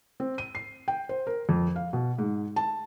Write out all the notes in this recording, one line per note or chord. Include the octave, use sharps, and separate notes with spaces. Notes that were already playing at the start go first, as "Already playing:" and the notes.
C4
D#7
C7
G5
C5
A#4
F2
F5
B2
G#2
A5